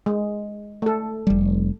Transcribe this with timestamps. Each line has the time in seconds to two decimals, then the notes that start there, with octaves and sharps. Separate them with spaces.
0.06 G#3
0.82 A3 A4
1.27 F1 G3